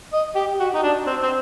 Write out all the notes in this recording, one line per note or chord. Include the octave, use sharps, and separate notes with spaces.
D#5
G4
F#4
D#4
D4
C4
C4